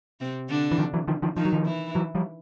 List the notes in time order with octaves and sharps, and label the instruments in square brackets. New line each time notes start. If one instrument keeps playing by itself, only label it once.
[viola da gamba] C3 C4
D3 D4
[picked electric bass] E3
D#3 F3
E3 F#3
D#3 F3
D#3 F3
[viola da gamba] D#3 D#4 [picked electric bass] F3
[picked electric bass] F#3
D#3 F3
[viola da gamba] E3 E4
[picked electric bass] E3 F#3
F3 G3